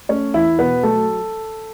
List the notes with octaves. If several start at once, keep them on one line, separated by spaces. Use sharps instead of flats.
A3 C#4 C#5
E2 E4 E5
B2 B3 B4
F#3 A3 A4